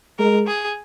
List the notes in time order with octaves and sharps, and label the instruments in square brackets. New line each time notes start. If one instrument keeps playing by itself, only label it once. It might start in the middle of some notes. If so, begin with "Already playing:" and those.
[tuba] G#3 [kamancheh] A#4
[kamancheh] G#4